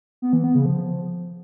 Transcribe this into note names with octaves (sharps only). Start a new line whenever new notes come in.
B3
E3
B3
C#3
F3